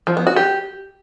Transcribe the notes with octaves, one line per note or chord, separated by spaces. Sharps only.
F3
B3
F#4
G4